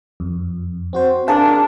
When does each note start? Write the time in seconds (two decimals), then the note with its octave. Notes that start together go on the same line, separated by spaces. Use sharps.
0.20 F2
0.93 C4 F#4 C5
1.28 D4 G#4 A#4 F5 A5